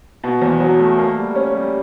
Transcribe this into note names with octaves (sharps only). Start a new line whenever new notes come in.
B2
E2
F#3
A3
A#3
G3
C#4
G3